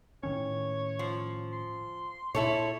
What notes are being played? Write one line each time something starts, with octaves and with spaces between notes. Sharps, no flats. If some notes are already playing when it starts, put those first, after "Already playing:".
A2 D#3 C#4 C#5
F3
C6
A#2 E4 A4 C#5